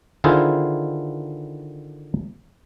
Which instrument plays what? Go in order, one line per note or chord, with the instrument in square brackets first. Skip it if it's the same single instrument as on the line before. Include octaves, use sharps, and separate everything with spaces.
[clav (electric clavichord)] D3 D#3 E4 F4 G#4 C5